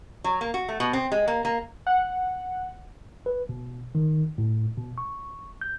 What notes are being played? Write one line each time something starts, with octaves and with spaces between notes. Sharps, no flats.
F#3
A#3
F#4
A3
B2
C4
G#3
A#3
A#3
F#5
B4
B2
D#3
A2
B2
C#6
G6